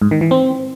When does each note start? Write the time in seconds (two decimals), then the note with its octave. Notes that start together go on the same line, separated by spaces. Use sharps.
0.02 G#2
0.11 D#3
0.21 E3
0.31 C4